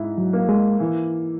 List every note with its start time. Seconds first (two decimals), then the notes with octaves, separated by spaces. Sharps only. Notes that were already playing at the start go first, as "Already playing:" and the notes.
Already playing: G#2 E4
0.18 F#3
0.33 A#3
0.49 G#3
0.80 E3